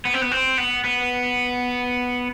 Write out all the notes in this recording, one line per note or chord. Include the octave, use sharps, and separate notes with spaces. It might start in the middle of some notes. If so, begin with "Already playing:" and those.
B3
C4
B3
C4
B3
B3